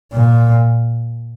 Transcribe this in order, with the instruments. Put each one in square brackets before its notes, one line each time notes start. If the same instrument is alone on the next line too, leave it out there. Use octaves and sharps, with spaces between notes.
[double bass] A#2